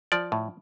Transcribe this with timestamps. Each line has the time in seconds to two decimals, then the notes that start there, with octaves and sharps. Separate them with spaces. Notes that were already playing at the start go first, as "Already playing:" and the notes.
0.12 F3 D5
0.32 A2